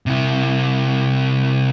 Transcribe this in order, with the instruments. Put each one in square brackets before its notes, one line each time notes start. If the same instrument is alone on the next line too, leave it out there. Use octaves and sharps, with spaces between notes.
[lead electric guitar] C3 E4